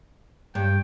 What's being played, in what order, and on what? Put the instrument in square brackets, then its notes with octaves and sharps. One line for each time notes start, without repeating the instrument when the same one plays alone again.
[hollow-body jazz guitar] G2 [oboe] G5